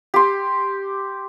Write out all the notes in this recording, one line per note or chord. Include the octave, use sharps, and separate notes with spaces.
G4 C6